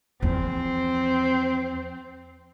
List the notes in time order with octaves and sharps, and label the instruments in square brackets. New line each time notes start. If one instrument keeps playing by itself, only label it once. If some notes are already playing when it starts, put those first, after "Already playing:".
[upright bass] E2 F3 [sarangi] C4